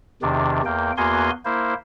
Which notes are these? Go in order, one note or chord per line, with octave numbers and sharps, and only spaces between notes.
E2 C3 D#3 D4
E2 A#3 G5
E2 A#3 B3 F#4 G#5 C6
A#3 E4 C5